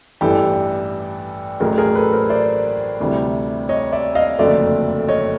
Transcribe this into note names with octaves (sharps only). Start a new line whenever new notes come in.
A1 G2 E3 G4 A4
A1 A2 F#3 A3 G#4 A#4
G#4 A#4
A4 B4
A#4 C5
C5 D5
D2 C3 E3 G3
C#5 D#5
D5 E5
D#5 F5
F#1 F2 D3 F#3 A3 D5 E5
C#5 D#5